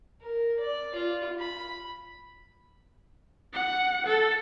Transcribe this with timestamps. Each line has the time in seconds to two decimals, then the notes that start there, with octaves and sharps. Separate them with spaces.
0.21 A#4
0.59 D5
0.95 F4
1.39 B5
3.53 F#5
4.06 A4